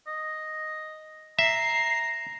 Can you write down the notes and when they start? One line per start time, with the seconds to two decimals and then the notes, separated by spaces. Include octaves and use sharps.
0.07 D#5
1.39 E5 A#5 C7